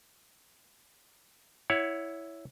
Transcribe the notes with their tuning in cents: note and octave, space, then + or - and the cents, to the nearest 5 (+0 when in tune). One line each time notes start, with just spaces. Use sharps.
E4 +0 C#5 +15 F#5 +0